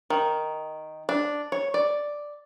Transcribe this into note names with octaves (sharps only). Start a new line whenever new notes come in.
D#3
D4
C#5
D5